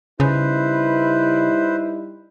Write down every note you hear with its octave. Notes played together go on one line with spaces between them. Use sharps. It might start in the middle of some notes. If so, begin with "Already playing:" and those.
C#3 G3 D#4 E4 B4 C5